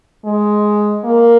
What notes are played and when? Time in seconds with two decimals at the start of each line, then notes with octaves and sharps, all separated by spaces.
0.25 G#3
1.05 A#3